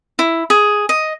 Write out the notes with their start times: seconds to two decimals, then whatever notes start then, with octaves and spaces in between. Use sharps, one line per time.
0.19 E4
0.50 G#4
0.89 D#5